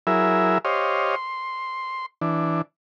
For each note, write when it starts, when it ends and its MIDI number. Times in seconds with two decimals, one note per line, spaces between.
0.07 0.58 54
0.07 0.58 64
0.07 0.58 68
0.07 0.58 70
0.07 0.58 76
0.65 1.15 67
0.65 1.15 72
0.65 1.15 73
0.65 1.15 75
0.65 1.15 77
1.16 2.06 84
2.21 2.62 52
2.21 2.62 62